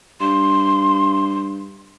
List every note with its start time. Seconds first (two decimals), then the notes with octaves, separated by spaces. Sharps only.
0.20 G2 C6